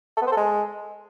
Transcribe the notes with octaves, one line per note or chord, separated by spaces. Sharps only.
A4
B3
C5
A4
G#3